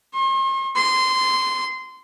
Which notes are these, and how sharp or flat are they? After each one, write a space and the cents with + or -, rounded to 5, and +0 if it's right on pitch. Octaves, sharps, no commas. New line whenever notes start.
C6 +45
C6 -15